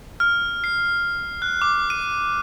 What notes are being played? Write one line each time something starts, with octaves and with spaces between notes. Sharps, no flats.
F6
C7
F#6
D6
D#7